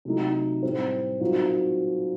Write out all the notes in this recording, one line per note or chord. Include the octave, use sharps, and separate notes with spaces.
C3 F#3 A3 D#4
A2 G3 C4
A#2 F#3 C4 D#4 F#4